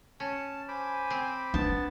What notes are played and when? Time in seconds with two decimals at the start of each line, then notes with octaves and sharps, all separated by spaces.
0.20 C#4 A5
0.68 C5 G#5 B5 D6
1.10 C4
1.54 B3 D4 A5